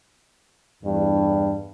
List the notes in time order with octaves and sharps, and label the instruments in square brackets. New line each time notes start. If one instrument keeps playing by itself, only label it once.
[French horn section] E2 G2